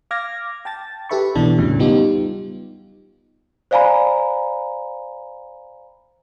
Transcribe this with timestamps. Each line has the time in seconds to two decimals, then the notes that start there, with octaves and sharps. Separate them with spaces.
0.11 F5 D6 F6 G#6 A#6
0.65 G5 A5 A6
1.09 G4 A4 B4 E5 B5 C#6
1.35 B1 B2 E3 D4 A5
1.58 E2 A2 C#3 F#3
1.79 G3 B3 D#4 F4 G4
3.71 C5 D5 F5 G#5 A#5 B5